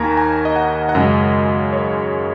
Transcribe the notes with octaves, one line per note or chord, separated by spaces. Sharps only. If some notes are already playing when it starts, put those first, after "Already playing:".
Already playing: D#2 D#3 A#3 G#5 A#5
G#5
D#5
F#5
F#5
F#2 C#3 G#3 D#5
C#5